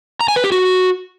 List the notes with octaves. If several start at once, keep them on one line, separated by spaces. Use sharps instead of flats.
A#5
G#5
B4
G4
F#4